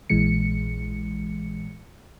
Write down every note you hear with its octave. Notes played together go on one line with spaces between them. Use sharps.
A#1 A#2 E3 G#3 C#7